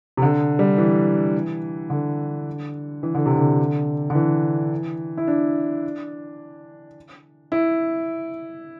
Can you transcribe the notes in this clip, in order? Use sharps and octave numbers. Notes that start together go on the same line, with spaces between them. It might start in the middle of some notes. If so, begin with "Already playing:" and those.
C3
D3
G3
E3
D3
E3
D3
C3
D3
D3
E3
E4
D4
E4